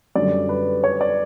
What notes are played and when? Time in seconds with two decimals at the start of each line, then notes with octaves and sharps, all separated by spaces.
0.15 F#2 D3 G3 D5
0.49 B4
0.84 C#5
1.01 D5